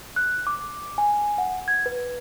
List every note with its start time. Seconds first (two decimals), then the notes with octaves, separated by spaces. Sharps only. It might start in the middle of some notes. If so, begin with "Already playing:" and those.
0.16 F#6
0.47 D6
0.98 G#5
1.38 F#5
1.68 G#6
1.86 B4